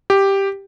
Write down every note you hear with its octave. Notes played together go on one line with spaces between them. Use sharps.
G4